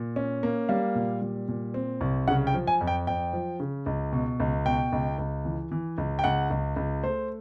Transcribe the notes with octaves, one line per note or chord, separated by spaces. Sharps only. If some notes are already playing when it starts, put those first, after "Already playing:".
Already playing: A#2
C#4
A#3
G3 F5
A#2
G3
A#2
C4
C2
C#3 F#5
G5
F3
G#5
F2
G5
F2 G5
F3
C#3
C#2
B2
C#2
B2 G5
C#2
C#2
E3
E3
C#2
G5
C#2 F#5
C#2
C#2
A3 C5